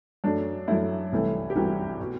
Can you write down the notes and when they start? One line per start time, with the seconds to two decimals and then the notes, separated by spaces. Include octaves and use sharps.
0.24 F#2 F#3 A3 D4
0.68 F#2 F#3 A3 E4
1.12 C2 C3 E3 A3
1.50 G4
1.56 C2 C3 E3 A3 F#4
2.00 B2